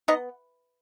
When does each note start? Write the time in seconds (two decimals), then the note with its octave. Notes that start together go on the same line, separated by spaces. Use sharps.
0.08 B3 D#4 D#5